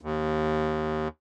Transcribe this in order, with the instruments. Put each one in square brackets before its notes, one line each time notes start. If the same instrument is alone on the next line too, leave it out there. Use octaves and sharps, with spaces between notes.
[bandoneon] D#2